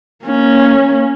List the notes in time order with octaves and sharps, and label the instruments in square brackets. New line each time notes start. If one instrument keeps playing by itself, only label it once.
[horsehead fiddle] A#3 C#4